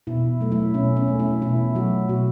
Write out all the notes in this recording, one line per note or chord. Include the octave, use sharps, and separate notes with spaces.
B2 E4
F#3 A3
E4
B2 C#4
C#4
A3
E4
B2 E4
F#3 A3 F#4
B2 F#4